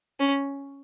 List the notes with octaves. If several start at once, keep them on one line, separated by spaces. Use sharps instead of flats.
C#4